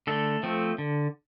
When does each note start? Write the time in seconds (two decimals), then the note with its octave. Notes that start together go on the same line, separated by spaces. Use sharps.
0.07 D3 A3 A4
0.43 F3 A3 C4
0.78 D3